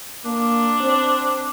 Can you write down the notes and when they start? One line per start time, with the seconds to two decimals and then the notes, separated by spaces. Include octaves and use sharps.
0.25 A#3 D4
0.81 C4